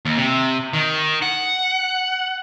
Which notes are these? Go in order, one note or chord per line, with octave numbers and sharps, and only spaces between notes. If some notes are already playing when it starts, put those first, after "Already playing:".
D#2
C3
D#3
F#5